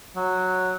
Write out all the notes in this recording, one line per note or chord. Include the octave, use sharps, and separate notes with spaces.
F#3